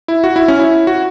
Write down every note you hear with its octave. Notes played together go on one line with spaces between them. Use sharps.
E4
F#4
E4
C#4
E4
F#4